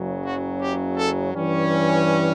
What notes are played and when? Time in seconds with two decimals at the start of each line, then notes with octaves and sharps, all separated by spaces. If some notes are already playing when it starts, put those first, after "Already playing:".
Already playing: F#1 F#2 C#3 F#3
0.24 F#4
0.61 G4
0.97 A4
1.34 G2 E3 G3 C#4